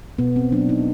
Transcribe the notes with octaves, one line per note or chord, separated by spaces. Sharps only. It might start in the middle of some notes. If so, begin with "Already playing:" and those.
B2 B3
C4
F#3 A#3 D4
D#4